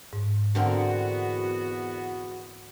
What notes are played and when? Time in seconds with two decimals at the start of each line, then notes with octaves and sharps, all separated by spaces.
0.13 G#2
0.55 E2 D3 B3 C4 F#4 A#4